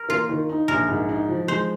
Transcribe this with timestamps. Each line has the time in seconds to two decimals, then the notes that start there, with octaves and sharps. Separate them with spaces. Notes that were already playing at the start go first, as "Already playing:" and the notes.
Already playing: A#4
0.09 A#3 F4
0.29 D#3
0.49 D#4
0.68 A#1 A#4
0.89 G#2
1.09 D#4
1.28 F3
1.48 G#3 C5